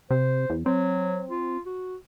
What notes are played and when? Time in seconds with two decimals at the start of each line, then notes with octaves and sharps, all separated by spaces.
0.11 C3 C5
0.50 E2
0.66 F#3 C4
1.30 F4
1.66 F#4